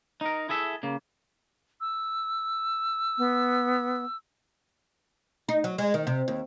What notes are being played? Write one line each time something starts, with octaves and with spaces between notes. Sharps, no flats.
D#4 A#4
E4 G#4 A4 E5
C#3 A#3
E6
B3
D#4
F#3
G#3
D#3
C3
D#2